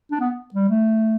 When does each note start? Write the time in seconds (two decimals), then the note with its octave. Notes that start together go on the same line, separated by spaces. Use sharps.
0.11 D4
0.20 B3
0.54 G3
0.69 A3